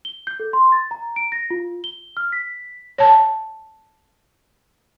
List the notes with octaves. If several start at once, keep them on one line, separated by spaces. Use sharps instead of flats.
G7
G6
A4
C6
A6
A#5
D7
A#6
F4
G7
F6
B6
C#5 A5